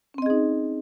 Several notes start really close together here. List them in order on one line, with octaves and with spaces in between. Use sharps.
C#4 C4 D#5 G#4 D#4